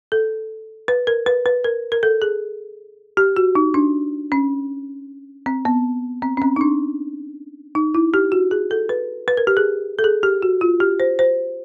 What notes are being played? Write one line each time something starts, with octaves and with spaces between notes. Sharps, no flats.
A4
B4
A#4
B4
B4
A#4
A#4
A4
G#4
G4
F#4
D#4
D4
C#4
C4
B3
C4
C#4
C4
D#4
D4
D#4
E4
G4
F#4
G#4
A4
B4
B4
A#4
G4
G#4
A4
G#4
G4
F#4
F4
G4
C5
C5